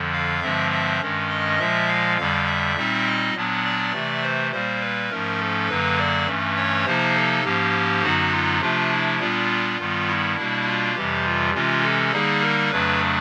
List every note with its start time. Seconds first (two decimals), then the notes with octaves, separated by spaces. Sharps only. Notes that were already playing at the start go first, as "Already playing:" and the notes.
Already playing: F2 D3 F3
0.13 F5
0.42 G2 D3 F3 G#3 C4 E5
0.71 E5
1.01 G2 D#3 G#3 C#4
1.30 D#5
1.59 A#2 F3 G#3 E5
1.88 F5
2.18 F2 D3 G3 F5
2.47 E5
2.76 A#2 G3 C4 D#4
3.05 D#5
3.35 A#2 F#3 B3 D4
3.64 D5
3.93 C3 E3 A3
4.22 C5
4.52 A#2 G3 A#3 C5
4.81 B4
5.10 G#2 F3 A3 C#4 A#4
5.40 A4
5.68 F#2 D3 F#3 A#3 B4
5.98 D5
6.27 G2 E3 A3 C#4
6.56 C#5
6.86 C3 F3 A#3 D#4 C5
7.14 A4
7.44 G#2 F3 A#3 C#4 G4
8.02 F#2 D3 F#3 B3 D#4 F#4
8.32 F4
8.61 C3 F3 A3 D4 F4
8.91 E4
9.19 A#2 G3 B3 D4 F4
9.78 G2 D#3 G3 B3
10.07 E4
10.37 B2 G3 A#3 D4
10.66 F4
10.95 F2 C3 E3 G3 G4
11.25 F4
11.54 C3 E3 G#3 C#4 F4
11.83 A4
12.12 D3 G3 A#3 D#4 G#4
12.41 A#4
12.71 F2 C#3 F#3 A3 D4 B4